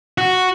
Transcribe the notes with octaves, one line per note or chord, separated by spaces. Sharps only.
F#4